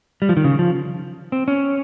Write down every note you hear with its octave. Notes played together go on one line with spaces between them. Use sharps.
G3
F3
D#3
C#3
F3
C4
C#4